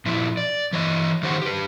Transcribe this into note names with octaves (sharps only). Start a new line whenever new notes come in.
A#2 F3 E4
D5
E3 C#5 D#5
D#3 D#4 G4 C5 C#5 F#5
G4 B4